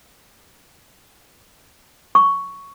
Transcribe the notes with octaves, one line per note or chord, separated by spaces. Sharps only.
C#6